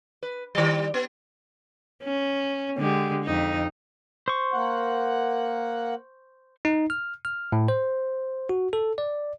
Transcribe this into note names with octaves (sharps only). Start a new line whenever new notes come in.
B4
D#3 G3
B3
C#4
D3 G#3 G4
F2 D#4
C5 C#6
A#3 F#5
D#4
F6
F6
A2
C5
F#4
A4
D5